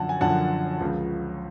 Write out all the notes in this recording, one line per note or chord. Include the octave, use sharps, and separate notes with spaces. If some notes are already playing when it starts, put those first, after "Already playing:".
Already playing: F#2 D3 F3 F#5 A5
G#5
F#2 D3 F3 F#5 A5
C#2 C#3 F3